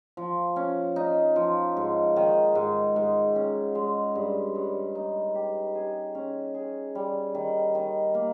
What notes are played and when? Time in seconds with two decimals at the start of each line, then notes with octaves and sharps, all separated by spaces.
0.17 F3
0.56 C#4
0.96 D#4
1.36 F3
1.77 G#2
2.16 D#3
2.55 G#2
2.96 G#2
3.36 C#4
3.75 G#3
4.15 G2
4.55 G2
4.95 D#4
5.35 G4
5.75 G#4
6.15 C#4
6.54 G#4
6.95 G3
7.35 D#3
7.75 D#3
8.14 A#3